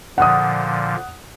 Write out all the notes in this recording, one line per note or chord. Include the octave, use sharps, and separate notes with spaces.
A#2 D3 F3 F#5 D#6